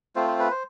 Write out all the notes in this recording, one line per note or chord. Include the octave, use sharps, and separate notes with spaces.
A3 C4 F4 C5
C5
B4
C5